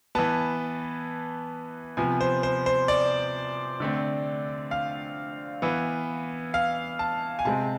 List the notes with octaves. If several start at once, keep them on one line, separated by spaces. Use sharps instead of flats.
E3 B3 A5
C3 F3 B3 G#5
C5
C5
C5
D5
D3 A3 C4
F5
E3 B3
F5
A5
G#5
C3 G#3 C4 A5